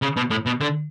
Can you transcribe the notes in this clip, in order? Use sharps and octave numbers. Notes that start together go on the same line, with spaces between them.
C#3
B2
A2
B2
D3